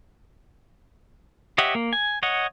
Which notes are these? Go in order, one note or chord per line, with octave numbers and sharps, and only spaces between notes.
G4 C#5 D#5 E5 F#5
A#3
G#5
C#5 D#5 F#5